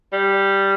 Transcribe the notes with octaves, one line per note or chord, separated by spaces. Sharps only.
G3